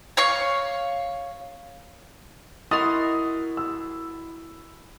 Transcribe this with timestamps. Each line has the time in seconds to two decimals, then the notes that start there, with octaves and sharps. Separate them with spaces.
0.17 C#5 F5 C#6
2.71 E4 F#4 A#4 D#5 C6 D#6 A6
3.57 E6